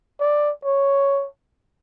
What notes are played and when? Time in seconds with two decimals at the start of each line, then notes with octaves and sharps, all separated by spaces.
0.20 D5
0.65 C#5